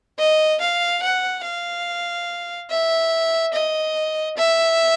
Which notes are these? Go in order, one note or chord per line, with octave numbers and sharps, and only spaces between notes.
D#5
F5
F#5
F5
E5
D#5
E5